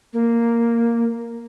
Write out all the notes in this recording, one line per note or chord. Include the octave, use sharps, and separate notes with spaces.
A#3